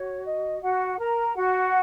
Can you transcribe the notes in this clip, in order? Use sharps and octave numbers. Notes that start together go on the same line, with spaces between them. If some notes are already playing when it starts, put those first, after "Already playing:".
Already playing: F#4 C#5
D#5
F#4 F#5
A#4 A#5
F#4 F#5